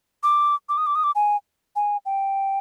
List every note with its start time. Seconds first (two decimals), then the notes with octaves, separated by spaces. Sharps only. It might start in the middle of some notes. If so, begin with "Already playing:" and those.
0.23 D6
0.69 D6
0.78 D#6
0.87 D6
0.95 D#6
1.04 D6
1.15 G#5
1.76 G#5
2.06 G5